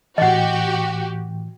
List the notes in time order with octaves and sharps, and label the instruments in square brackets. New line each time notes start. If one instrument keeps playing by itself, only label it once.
[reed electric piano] A2 E3 [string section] F#4 G4 [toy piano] D#5 F#5